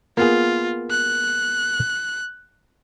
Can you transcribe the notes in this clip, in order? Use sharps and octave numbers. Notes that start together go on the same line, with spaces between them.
A#3 B3 F4 G#4
F#6